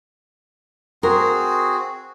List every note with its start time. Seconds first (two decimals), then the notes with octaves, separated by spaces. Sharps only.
1.03 C4 F#4 G#4 A#4